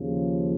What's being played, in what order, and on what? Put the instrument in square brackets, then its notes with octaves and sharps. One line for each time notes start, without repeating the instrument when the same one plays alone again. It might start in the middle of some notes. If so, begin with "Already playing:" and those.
Already playing: [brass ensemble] D#2 C#3 F3